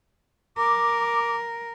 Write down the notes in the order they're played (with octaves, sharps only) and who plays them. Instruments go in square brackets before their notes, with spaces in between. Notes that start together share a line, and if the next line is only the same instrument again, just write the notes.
[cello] A#4 [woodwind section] D6